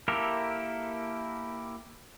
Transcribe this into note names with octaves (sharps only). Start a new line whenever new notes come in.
A#3 E4 G4 A4 A#4